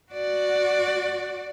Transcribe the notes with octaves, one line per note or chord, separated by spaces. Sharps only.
F#4 D5